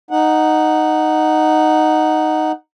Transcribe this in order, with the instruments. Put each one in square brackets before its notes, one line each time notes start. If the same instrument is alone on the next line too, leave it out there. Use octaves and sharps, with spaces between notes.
[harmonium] D#4 F#5